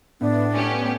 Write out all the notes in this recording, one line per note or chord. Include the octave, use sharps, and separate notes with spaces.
A2 B3 D4
A3 C#4 G4